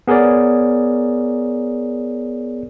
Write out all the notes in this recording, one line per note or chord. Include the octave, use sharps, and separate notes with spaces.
B3 G#4 A#4 C#5 D5